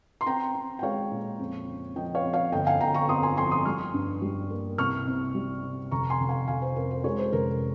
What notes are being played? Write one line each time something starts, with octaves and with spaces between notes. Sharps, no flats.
C6
C4 G5 A#5
C4
G5
G#3 C#5 F5
A#2
F2
C#3
F3 D#5 G5
C#5 F5
F2
C#5 F5
G1 D#5 G5
F5 G#5
G1 G5 A#5
A#5 C#6
F2 C6 D#6
G#5 C6
F3 G#5 C6
C6 D#6
G3 C#6 F6
G2
G3
A#3
C2 C#6 F6
C3
G3
C3
F1 A#5 C#6
G#5 C6
F1
F5 G#5
F1 F5 G#5
C5
F2 A#4
C5
G#3 A#4 C#5
C5
F1 A#4